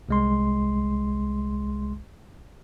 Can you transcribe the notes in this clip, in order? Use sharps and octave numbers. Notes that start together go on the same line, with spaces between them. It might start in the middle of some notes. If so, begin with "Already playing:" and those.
C2 G#3 C6